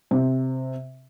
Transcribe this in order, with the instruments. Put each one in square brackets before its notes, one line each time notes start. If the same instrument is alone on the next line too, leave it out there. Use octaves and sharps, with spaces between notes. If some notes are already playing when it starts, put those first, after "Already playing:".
[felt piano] C3